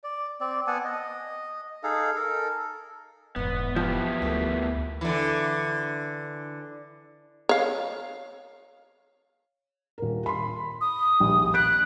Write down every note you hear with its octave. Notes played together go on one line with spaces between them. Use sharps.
D5
C4 D5
B3 F#5 G#5 A5
D#5
D#4 G#4 A4 F5
A4 A#4
E1 E2 G#2 B3
F3 B3 E4 G4
D2 A3 A#3 A4
D3 E3
C#5 F5
D#1 A#4
B5 C6
D#6
A#1 D#2
F#6 G6 B6 D7